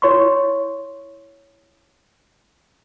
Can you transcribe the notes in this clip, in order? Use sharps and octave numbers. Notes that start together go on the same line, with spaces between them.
E4 C#5 C6 C#6